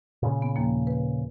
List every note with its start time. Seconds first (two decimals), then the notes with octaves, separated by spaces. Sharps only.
0.23 A#2 C#3
0.42 B3
0.56 D#2 F3 A#3
0.87 B4